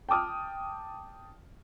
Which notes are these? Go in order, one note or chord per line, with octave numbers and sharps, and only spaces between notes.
G5 A5 D6 D#6 F6